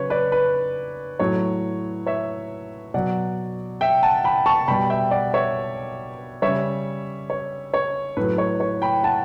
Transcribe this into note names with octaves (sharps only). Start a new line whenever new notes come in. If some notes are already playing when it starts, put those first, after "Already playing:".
Already playing: C#3 F#3 B4 C#5
B4 D5
B4
A2 F#3 C#5
C#5 E5
B2 F#3 D5 F#5
E5 G5
F#5 A5
G5 B5
A5 C#6
B2 G3 G5 B5
E5 G5
D5 F#5
C#5 E5
C#3 G3 C#5 E5
C#5
C#5
A2 F#3 B4
C#5
C#5
G5 B5
F#5 A5